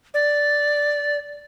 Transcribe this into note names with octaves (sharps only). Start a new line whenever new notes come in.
D5